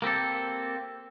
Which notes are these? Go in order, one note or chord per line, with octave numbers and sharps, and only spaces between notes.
A#3 C4 G4 A4